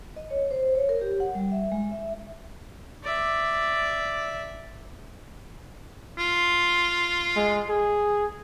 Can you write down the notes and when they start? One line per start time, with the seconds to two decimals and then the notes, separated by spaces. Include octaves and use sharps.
0.16 D#5
0.31 C#5
0.51 C5
0.75 C#5
0.89 A#4
1.01 G4
1.20 F#5
1.35 G3
1.52 E5
1.72 G#3
1.91 E5
3.03 D5 E5
6.19 F4
7.36 G#3
7.69 G#4